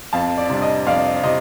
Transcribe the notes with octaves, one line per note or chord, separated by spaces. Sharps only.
F2 F5 A5
D5
C3 G3 D4
D#5
F2 D5 F5
C3 D#5